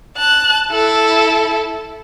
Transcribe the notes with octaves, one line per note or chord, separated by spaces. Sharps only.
A5 F#6
E4 A4